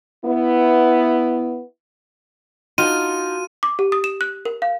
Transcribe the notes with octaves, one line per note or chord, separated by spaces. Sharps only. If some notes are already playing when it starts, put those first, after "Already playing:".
B3 E4
D#4 F4 F#4 A5 D#7
D6
G4
D#6
E7
F#6
A#4
F5